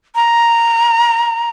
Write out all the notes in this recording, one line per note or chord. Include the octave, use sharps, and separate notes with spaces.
A#5